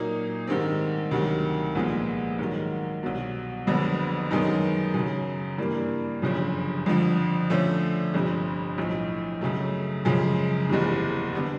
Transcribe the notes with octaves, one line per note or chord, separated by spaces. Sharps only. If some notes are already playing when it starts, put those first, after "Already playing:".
Already playing: A#2 F#3 A#3 D#4
G#2 D#3 G3 C4
D2 C3 D#3 F#3
C2 A#2 F3 G#3 B3
G#2 D#3 F#3
C2 B2 F#3
F#1 F2 D3 F#3 B3
F#2 D#3 G#3 B3 D#4
F#2 C#3 F#3
G2 E3 G3 A#3 D4
G1 F#2 C#3 F3
F2 D3 F3
D3 F3 A3 C#4
G1 F2 C3
B1 A2 F3
F#2 C#3 F#3 A3
F#2 C#3 F3 G#3
F#1 E2 C3 E3
D3 G3 B3 D4